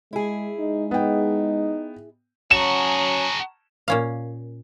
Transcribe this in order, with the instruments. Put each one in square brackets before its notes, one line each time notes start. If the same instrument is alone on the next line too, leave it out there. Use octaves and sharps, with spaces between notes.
[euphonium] G#3 [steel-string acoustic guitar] E4 G#4
[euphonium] G#3 [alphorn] D#4
[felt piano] B3 G5 [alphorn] D#4
[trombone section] F#3 C#4 [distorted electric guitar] F#4 G#4 [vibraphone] A5 A#5 C#6 [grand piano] E7
[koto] A#2 C#4 F5